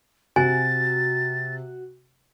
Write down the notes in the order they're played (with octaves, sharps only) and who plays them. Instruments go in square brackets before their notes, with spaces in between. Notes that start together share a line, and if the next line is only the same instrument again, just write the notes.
[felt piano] C3 [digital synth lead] F#4 [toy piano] G#5 [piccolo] A6